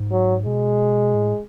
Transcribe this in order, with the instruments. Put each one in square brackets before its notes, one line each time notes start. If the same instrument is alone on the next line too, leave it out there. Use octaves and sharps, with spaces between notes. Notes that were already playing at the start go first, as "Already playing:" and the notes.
Already playing: [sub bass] G#2
[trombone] F#3
[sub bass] B2 [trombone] G#3
[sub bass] A2